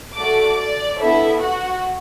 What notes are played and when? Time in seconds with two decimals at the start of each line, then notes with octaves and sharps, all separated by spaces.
0.16 A3 F#4 A4 D5 D6
0.57 D5
0.98 B3 D4 E4 A4 E5
1.40 F#4 F#5